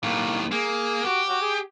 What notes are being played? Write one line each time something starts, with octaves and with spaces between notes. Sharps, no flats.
D#2 A2 A#3
A#3 G#4
F#4 G4
F#4
G#4